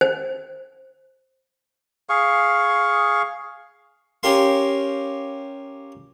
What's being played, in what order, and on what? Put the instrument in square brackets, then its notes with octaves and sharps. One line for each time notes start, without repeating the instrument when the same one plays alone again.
[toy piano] C5
[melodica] G#4 F5 C#6
[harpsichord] C#4 G4 A#4 F5 C6